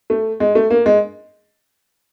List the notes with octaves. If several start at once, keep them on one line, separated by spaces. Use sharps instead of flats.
A3
G#3
A3
A#3
G#3